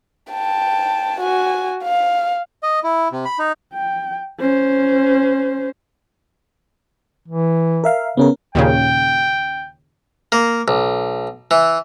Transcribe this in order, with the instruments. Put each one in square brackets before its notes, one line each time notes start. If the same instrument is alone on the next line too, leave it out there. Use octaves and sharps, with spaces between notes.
[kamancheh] G5 A5
F#4 G#5
F5
[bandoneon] D#5
E4
C3
B5
D#4
[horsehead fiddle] G5
C#4 C5
[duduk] E3
[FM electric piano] A#4 E5 F5
[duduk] C#3 [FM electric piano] B3 C#4 A#4
[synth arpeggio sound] D#2 A#2 C#3 [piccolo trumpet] G5
[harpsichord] A#3
B1
E3